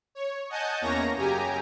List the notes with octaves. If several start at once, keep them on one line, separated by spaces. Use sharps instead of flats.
C#5
D#5 F#5 G#5 A5 G6
E2 A#3 C#4 C#5 A#5 A#6
F#2 C#3 G4 G#5 A#5